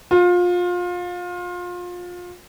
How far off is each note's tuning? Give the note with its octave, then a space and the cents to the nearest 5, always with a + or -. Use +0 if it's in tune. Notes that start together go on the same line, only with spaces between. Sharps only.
F4 +25